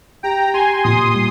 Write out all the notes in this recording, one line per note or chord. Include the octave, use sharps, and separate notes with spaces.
G4 G5 A#5
G4 G#5 C6
A#2 C6 D#6
G3